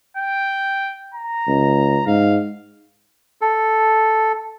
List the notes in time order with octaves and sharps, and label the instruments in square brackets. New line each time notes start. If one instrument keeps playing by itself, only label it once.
[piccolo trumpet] G5
A#5
[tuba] C#2
[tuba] G#2 [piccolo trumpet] F5
[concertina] A4